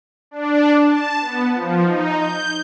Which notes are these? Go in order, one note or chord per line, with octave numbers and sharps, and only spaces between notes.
D4
A5
B3
F3
D#4
G6